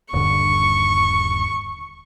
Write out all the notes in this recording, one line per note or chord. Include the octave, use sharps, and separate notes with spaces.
D#1 G2 D3 C#6